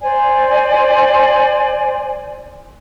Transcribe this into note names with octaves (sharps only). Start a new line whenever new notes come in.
C5 D5 G#5